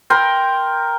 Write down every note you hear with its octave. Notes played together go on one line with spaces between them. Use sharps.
A#4 G5 C6